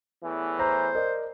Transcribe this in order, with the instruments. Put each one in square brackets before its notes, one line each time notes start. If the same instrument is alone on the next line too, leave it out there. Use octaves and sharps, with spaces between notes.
[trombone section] E2 A2 E3
[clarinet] C5 [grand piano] A#5
[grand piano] A#4 D5 D#5